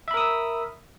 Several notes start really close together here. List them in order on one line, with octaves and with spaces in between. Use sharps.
E5 B5 A#4 D#6 E6